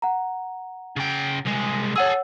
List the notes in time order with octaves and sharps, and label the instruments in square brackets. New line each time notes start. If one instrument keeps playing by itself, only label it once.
[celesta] F#5 A#5
[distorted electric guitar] C#3 G5
C2 G#3
[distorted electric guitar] G#4 A4 [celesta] C#5 F#5 E6